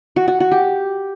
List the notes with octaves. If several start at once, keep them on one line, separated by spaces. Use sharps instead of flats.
F#4
F#4
F#4
G4